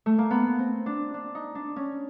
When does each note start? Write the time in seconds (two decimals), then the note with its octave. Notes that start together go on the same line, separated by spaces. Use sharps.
0.06 A3
0.18 A#3
0.31 B3
0.59 C4
0.86 D4
1.14 D4
1.35 D#4
1.55 D4
1.76 C#4